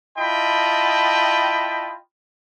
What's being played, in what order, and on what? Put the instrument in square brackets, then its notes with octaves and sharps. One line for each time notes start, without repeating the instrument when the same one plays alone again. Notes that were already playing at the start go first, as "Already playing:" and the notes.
[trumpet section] E4 F4 D#5 G5 A5 B5